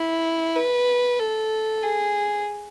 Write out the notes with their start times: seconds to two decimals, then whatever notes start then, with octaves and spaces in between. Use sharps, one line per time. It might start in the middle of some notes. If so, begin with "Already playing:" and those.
Already playing: E4
0.56 B4
1.19 A4
1.82 G#4